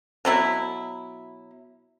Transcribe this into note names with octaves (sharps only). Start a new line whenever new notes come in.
B2 F#3 E4